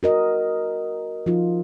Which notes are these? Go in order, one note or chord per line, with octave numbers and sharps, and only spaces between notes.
F#4 A#4 D#5
F3 D#4 F4